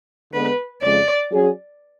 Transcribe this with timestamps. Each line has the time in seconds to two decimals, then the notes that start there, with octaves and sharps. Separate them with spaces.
0.33 D3 G#3 B3 B4
0.82 F2 C#3 G#3 D5
1.32 F#3 C#4 G#4